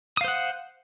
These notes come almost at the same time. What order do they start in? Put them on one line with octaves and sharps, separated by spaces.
D#6 F5 C5 F#5